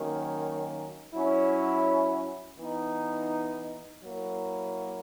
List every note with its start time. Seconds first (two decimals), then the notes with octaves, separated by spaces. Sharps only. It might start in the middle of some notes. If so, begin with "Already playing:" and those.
Already playing: D#3 F#3 A#3 C#4
1.14 F#3 C#4 E4
2.60 E3 B3 D#4
4.04 F#3 A#3 E4